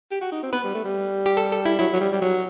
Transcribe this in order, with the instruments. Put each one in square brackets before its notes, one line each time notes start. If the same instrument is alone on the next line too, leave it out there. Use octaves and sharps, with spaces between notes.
[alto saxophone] G4
F#4
D#4
C4
[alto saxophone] B3 [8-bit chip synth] B4
[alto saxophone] G3
A3
G3
[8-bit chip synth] G4
A4
A4
E4
[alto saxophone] F#3 [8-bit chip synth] E4
[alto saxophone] F#3
G3
G3
F#3